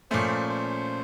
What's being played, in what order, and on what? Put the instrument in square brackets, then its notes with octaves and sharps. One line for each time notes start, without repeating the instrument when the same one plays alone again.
[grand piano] A#2 F3 A3 C#4 [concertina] C5
[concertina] C5